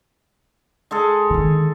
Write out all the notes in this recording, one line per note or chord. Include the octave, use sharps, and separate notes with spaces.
G#3 G#4 A4
D3 D#3